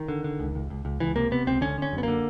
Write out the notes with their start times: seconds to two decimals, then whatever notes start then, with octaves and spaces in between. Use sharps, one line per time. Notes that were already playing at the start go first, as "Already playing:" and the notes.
Already playing: D#3
0.08 D3
0.24 D3
0.40 C#2
0.55 C#2
0.70 C#2
0.85 C#2
1.00 C#2 E3
1.16 C3 A#3
1.31 C3 B3
1.47 C#2 C4
1.61 D3 C#4
1.78 D3 C#4
1.92 F#2
1.98 B3
2.03 D3 A#3